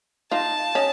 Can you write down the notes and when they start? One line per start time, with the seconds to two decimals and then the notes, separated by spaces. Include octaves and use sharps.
0.31 D#4 F4 A5
0.75 C#4 D#4